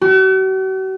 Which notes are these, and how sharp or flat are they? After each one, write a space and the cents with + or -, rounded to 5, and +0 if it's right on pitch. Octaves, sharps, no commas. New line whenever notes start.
F#4 +45